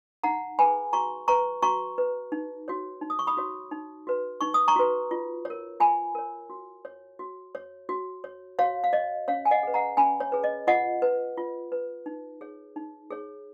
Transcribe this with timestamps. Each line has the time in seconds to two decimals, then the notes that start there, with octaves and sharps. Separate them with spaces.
0.23 D#4 F#5 A#5
0.59 G#4 B4 G#5 B5
0.93 F#4 A#5 C#6
1.28 B4 A#5 C#6
1.62 F#4 A#5 C#6
1.98 B4
2.32 D#4
2.68 F#4 C#5
3.01 D#4
3.10 D#6
3.19 C#6
3.27 B5 D#6
3.37 F#4 C#5
3.71 D#4
4.07 F#4 B4
4.41 D#4 C#6
4.54 D#6
4.68 A#5 C#6
4.76 F#4 B4
5.11 F4
5.45 C#5
5.50 A#4
5.80 F4 G#5 B5
6.15 A#4 C#5
6.50 F#4
6.85 C#5
7.19 F#4
7.55 C#5
7.89 F#4
8.24 C#5
8.59 F#4 C#5 F5
8.84 F5
8.93 C#5 D#5
9.28 C#4 C#5 F5
9.45 G#5
9.51 D#5 F#5
9.63 G#4 B4
9.74 F#5 A#5
9.97 C#4 G#5 B5
10.20 C#5
10.32 G#4 B4
10.44 D#5
10.67 F4 D#5 F#5
11.02 B4
11.37 F4
11.72 B4
12.06 D#4
12.41 G#4 C#5
12.76 D#4
13.11 G#4 C#5